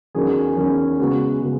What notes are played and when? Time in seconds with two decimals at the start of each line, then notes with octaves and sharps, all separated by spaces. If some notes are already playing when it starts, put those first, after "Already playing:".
0.15 E2 D#3 F#3 C#4 G#4
0.57 E2 D#3 F#3 C#4 G#4
0.99 C#3 G#3 B3 F#4
1.41 C#3 G#3 B3 F#4